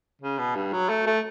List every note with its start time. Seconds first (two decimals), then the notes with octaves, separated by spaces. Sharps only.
0.21 C#3
0.39 B2
0.56 G2
0.73 F#3
0.89 A3
1.07 A3